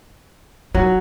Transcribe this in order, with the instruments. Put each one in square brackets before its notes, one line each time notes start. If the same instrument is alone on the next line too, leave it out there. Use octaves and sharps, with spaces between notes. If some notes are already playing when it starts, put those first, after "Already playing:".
[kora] F#3 [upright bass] D#4